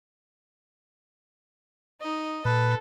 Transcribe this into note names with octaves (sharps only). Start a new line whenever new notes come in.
D#4 D#5
A#2 A4 B4